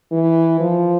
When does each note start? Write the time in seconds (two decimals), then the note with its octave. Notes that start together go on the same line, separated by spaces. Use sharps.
0.12 E3
0.60 F3